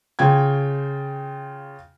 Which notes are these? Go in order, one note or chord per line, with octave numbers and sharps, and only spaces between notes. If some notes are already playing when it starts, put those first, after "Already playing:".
C#3 F4 G5 G#6